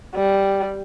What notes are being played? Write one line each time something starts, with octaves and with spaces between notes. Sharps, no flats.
G3